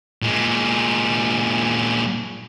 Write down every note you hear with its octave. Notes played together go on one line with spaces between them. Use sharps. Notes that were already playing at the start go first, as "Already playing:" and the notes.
A#2 G#3